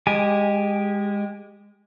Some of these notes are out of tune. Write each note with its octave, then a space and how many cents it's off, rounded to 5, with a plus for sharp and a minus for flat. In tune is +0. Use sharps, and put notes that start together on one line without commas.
G#3 -20 G4 +0 G#5 +0